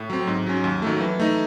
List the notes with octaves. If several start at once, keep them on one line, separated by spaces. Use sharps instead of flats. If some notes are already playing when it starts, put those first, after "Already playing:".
Already playing: A2
F#3 C4
G#2
F#3 C#4
D#2
D#3 F#3 A3
E3
A3 D#4